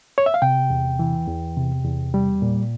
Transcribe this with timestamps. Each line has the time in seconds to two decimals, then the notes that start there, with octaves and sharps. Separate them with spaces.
0.18 C#5
0.26 E5
0.34 F5
0.42 C3 G5
0.70 E2
0.99 E3
1.28 E2
1.57 C3
1.85 E2
2.14 G3
2.42 A#2